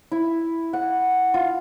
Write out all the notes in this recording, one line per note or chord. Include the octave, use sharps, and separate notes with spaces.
E4
F#5
F4